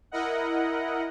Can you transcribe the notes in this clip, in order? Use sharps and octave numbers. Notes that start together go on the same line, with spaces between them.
E4 A#4 D#5 F#5